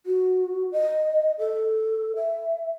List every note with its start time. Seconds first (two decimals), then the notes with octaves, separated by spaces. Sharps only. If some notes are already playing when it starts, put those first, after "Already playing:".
0.06 F#4
0.72 D#5
1.39 A4
2.16 E5